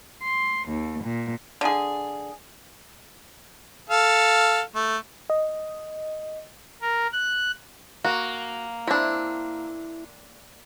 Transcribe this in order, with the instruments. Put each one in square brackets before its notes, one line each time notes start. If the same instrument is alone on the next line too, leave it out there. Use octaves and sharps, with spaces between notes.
[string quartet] C6
D#2
A#2
[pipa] D3 G#4
[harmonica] A4 F5
A3
[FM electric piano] D#5
[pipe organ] A#4
F#6
[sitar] A#3 [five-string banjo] F#4
[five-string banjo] C4 D4 [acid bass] E4